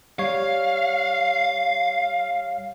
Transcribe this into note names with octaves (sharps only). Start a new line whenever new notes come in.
G3 C#5 F5